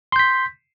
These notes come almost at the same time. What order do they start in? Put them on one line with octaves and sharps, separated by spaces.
C6 G6 B6